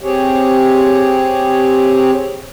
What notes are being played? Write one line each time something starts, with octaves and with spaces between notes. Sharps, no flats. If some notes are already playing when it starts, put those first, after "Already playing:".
C4 G4 G#4 C#5